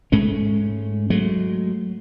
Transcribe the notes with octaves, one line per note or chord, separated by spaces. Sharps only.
G#2 G#3 A3 C#4
F#3 G#3 A3